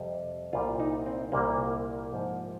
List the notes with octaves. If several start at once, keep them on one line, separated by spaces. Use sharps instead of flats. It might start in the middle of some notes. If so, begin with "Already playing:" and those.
Already playing: F2 C3 G3
C2 A#2 G3 F4
D#4
C4
C2 A#2 G3 A#3
G#2 F3